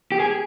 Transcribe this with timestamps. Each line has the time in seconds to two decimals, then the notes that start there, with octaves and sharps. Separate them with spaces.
0.12 G4
0.20 G#4